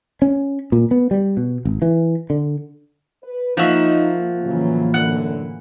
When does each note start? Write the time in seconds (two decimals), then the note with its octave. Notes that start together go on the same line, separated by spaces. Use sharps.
0.22 C#4
0.72 A#2
0.91 B3
1.11 G3
1.37 B2
1.65 G#1
1.82 E3
2.30 D3
3.23 B4
3.57 F3 A#3 D#4 F#4 E5
4.44 A2 C#3 E3 F#3 A#3
4.94 F#2 D3 F#5